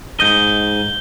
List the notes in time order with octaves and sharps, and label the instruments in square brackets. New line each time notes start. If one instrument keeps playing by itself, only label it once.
[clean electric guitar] G#2 D#5 [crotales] G6 G7